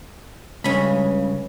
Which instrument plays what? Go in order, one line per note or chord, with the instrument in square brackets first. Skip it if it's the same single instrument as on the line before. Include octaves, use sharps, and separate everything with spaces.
[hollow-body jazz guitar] C#2 G2 C#3 [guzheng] C#4 B5